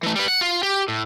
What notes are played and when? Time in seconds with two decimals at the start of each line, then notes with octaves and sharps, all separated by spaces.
0.03 E3 A3
0.16 G3 B4
0.28 F#5
0.41 F4
0.63 G4
0.88 A2